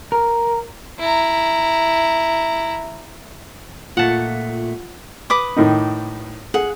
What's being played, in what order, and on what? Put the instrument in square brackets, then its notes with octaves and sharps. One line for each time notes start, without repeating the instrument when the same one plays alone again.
[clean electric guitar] A#4
[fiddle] E4 A#5
[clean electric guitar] A#2 A3 [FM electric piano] F4 [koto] F#5 A5
[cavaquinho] B4 D6 D#6
[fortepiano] A2 D#3 D#4
[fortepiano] G#4 [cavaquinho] F#5